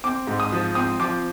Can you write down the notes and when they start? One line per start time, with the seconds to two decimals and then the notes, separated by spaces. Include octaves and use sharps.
0.04 C4 D6
0.27 G#2
0.40 D#6
0.52 F3
0.75 C4 D#6
0.99 F3 D6